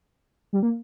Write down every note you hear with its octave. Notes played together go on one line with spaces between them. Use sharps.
G3
A#3